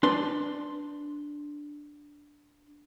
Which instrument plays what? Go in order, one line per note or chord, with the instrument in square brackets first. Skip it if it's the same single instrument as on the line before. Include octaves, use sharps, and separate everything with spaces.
[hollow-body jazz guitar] D4 B4 D5 C6